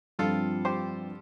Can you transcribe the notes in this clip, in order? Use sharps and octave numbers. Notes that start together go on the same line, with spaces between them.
G2 F3 C4 F4 A4
G4 C5